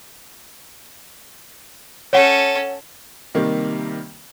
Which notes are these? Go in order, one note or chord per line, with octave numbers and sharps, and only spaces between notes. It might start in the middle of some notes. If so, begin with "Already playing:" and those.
C#4 A4 C#5 F#5
C3 D#3 G3 A#3